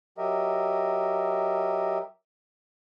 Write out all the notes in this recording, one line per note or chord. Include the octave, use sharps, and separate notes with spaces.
F#3 G4 A#4 D#5 E5